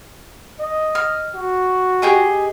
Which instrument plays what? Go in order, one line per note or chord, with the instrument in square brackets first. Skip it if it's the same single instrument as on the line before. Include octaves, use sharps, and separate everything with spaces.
[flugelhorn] D#5
[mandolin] F6
[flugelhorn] F#4
[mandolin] G4 G#4 D#5